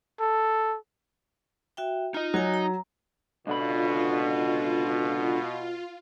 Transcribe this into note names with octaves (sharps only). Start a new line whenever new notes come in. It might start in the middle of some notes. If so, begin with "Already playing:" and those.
A4
F#4 E5 G5
D#4 F4 D#5
F#3 F#4 G#5
A#5
C#2 B2 D3 F4 B5